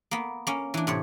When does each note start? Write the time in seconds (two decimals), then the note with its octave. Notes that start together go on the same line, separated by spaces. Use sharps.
0.11 A#3 B3
0.47 A#3 C#4
0.74 E3 D4
0.87 A2 C3 C#5